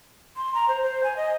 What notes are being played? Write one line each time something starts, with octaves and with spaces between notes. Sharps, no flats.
C6
A#5
C5
C5
G#5
D#5